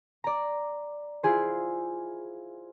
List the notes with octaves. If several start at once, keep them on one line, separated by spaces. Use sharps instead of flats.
D5 A#5
E4 F4 G#4 C5